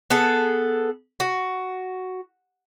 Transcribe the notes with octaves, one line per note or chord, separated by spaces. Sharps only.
B3 G#4 A4
F#4